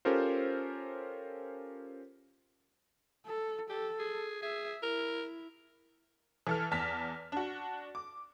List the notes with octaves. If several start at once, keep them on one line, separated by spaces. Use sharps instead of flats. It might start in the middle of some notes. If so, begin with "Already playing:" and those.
C#4 F4 G4 A4 A#4 C5
A4
G4 A4
G#4
G#4 E5
E4 A#4
E3 A4 F6
E2 A5 F6 B6
D4 F#4
D6